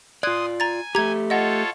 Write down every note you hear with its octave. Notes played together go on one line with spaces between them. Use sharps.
F4 D5 C6 D#6 F#6 G#6
G#5 A#5 A6
A3 G4 A#5 G#6
F4 A4 C#5 D#5 F#5